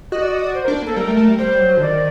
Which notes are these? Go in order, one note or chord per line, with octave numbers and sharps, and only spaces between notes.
F#4 D#5
D5
D#5
D5
C5
D4 A#4
A#3 A4
G3 A#4
A3
A3
G3
G3 C5
F#3
D3
D#3 D5